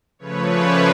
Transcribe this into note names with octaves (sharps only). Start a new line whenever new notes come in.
C#3 F3 A3 B4 C#5
C5 D5